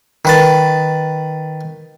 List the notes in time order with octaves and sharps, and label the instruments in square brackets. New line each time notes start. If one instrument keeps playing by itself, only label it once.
[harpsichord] D#3 B4 A5